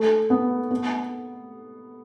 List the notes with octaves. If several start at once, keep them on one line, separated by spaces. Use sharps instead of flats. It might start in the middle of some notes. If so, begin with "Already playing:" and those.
Already playing: A3
B3
B3